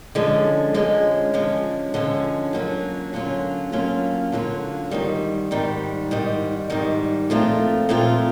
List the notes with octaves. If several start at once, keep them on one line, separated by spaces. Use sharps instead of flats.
D3 F3 G#3 C#4
D3 F3 G#3 C#4
D3 F3 G#3 C#4
D3 F3 G#3 C#4
D3 F#3 A#3 C#4 F4
D3 F#3 A#3 C#4 F4
D3 F#3 A#3 C#4 F4
D3 F#3 A#3 C#4 F4
G#2 D#3 G3
G#2 D#3 G3
G#2 D#3 G3
G#2 D#3 G3
A#2 F3 A3 C4 F4
A#2 F3 A3 C4 F4